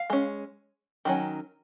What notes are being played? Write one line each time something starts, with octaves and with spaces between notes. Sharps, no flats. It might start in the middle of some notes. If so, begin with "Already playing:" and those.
Already playing: F5
G#3 C#4
D#3 F#3 C#4